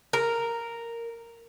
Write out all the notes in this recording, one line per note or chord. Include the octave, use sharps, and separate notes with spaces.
A#4